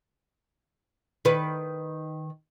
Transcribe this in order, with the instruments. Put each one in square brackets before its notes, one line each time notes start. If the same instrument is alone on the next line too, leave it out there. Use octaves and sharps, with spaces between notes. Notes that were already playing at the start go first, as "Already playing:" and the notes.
[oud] D#3 B4